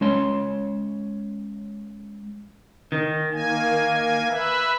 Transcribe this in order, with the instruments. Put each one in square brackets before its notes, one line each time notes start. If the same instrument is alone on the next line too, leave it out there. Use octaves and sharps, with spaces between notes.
[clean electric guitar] G#3 C#4 C#5 A5 C6
D#3
[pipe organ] A#3 G#5
B4 E5